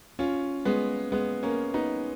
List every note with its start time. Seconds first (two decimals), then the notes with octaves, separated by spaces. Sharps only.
0.19 C#4 F4
0.65 G#3 B3
1.12 G#3 B3
1.43 A#3 C#4
1.74 B3 D#4